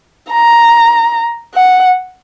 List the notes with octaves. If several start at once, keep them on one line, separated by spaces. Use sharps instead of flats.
A#5
F#5